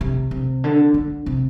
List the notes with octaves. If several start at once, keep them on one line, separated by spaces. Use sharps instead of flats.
C3
C3
D3
D3
C3